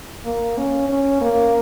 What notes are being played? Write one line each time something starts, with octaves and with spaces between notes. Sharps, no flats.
A#3
C#4
C#4
A#3